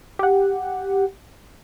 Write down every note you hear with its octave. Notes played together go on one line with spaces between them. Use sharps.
G4 F#5